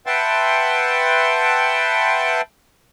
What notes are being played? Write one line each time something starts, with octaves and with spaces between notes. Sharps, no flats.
B4 E5 F#5 G5 A5 C6